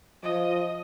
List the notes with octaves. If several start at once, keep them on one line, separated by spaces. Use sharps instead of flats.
F3 D#5